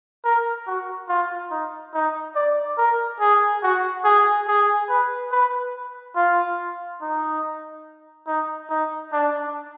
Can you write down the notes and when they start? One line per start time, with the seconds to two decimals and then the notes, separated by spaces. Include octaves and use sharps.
0.24 A#4
0.67 F#4
1.08 F4
1.51 D#4
1.94 D#4
2.35 D5
2.78 A#4
3.20 G#4
3.63 F#4
4.05 G#4
4.48 G#4
4.89 B4
5.32 B4
6.16 F4
7.02 D#4
8.27 D#4
8.70 D#4
9.12 D4